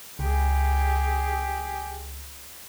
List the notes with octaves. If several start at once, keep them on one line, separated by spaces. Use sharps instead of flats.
C#2 G4 G#4